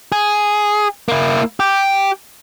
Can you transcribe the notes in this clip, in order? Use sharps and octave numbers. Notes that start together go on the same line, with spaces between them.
G#4
A#3 E4
G4